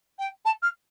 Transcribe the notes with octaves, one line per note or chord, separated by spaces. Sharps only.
G5
A5
F6